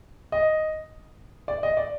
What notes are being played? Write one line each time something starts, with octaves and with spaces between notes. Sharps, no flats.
D#5
D5
D#5
D5